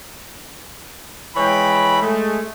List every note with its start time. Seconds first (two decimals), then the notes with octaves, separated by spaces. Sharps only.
1.36 E3 G#3 C#5 G5 B5
2.02 G#3 A3